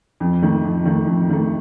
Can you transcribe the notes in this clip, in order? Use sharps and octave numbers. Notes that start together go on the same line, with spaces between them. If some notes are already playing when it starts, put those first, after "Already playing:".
F2
D#3 A3
F2
D#3 A3
F2
D#3 A3